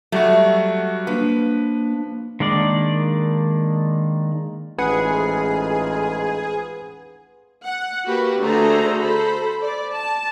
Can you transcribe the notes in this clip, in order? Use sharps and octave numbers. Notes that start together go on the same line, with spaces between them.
F#3 G3 A3 F#4
F3 A#3 D4 B4
D#3 G#3 A#3 D4 D5
A1 F2 G#2 F4 G#4 B4 F#5
F#5
A#3 F#4 G4 B4
D3 A3 F#4 G#4 C5 A#5
A4 C5 B5
D5
A5